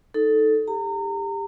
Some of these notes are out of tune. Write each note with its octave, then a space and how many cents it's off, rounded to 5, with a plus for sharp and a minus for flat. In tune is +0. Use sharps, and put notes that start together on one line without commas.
D#4 +15 A4 +0
G4 +25 A#5 -30